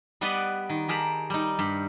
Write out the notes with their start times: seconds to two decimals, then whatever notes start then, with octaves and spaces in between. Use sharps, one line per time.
0.21 G3 B3 B4 D5 D#5 F#5
0.69 D#3
0.88 G4 G#4 A#4 A5 B5
1.30 G3 D#4
1.59 G2